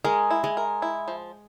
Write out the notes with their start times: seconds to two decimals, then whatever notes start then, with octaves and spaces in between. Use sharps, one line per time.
0.04 G#3 A#4
0.31 E4
0.44 G#3
0.57 A#4
0.82 E4
1.08 F3